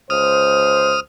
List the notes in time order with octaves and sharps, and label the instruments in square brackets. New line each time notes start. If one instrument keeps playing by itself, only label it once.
[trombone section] C#2 C5 [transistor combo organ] D#6 F6